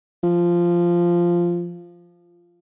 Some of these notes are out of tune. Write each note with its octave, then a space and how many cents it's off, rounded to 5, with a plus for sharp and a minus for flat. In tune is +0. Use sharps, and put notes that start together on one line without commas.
F3 -10